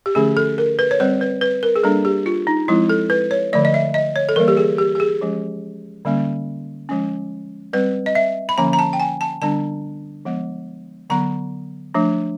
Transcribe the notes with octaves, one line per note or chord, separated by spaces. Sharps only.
G4
D3 F3 A3 C#4 G#4
A4
A#4
B4
C#5
G3 C4 C5
B4
B4
A#4
G#4
G3 A#3 D4 A4
G4
F4
D#4
F3 G#3 C4 E4
A4
B4
C#5
D3 F3 A3 D5
D#5
E5
D#5
C#5
A4
E3 G3 A#3 A#4
G4
G#4
G4
G4
G#4
F3 G#3 C#4
D3 G3 A#3 C#4
F3 G#3 C#4
G3 C4 B4
D#5
E5
B5
D3 F3 A#3 C#4 A#5
A#5
A5
G5
G#5
A5
D3 G3 B3 D4 A5
F3 G#3 B3
D3 F#3 B3 A#5
F3 A3 D4